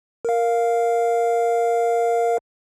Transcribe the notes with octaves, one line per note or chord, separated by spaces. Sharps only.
A#4 F5